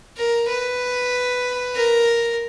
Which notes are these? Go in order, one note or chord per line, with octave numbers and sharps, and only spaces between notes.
A#4
B4
A#4